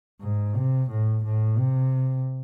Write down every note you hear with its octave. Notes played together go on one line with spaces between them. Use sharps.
G#2
C3
A2
A2
C3